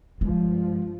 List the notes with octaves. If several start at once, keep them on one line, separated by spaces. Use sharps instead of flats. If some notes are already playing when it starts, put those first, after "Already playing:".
G2 F3 G#3